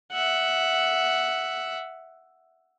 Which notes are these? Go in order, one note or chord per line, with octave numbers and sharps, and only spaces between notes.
E5 F#5